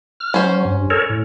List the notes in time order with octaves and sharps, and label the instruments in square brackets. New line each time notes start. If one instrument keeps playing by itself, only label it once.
[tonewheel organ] F6
[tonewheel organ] F#3 [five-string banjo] C#4 C5
[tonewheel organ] G2
A4 A#4 C#5
A2